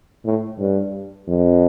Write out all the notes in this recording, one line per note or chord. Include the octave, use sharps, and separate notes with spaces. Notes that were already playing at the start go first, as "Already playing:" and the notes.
A2
G2
F2